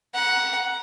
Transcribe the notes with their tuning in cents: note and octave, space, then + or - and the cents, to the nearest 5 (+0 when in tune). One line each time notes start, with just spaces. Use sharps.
F#5 +0 A#5 +35